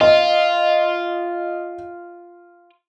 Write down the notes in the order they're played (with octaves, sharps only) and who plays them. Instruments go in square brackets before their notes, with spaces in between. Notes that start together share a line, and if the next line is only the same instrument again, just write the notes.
[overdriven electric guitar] F4 [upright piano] D#5